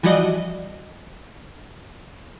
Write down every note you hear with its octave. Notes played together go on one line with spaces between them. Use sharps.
E3 F3 G3 F#4 D5 D#5